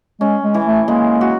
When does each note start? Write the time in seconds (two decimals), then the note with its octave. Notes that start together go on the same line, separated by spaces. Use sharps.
0.20 G#3 C#4
0.44 G#3
0.54 E3
0.66 A3
0.88 G#3 A#3
1.21 F#4